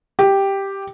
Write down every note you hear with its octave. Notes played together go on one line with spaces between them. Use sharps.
G4